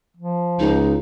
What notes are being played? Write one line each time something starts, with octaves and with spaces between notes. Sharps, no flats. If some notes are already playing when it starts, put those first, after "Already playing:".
F3
C#2 D#4